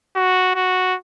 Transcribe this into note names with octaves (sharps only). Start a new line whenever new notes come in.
F#4
F#4